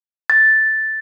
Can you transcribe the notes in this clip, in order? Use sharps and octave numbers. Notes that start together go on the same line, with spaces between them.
A6